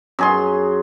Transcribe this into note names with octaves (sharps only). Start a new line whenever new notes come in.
F#2 G#4 C6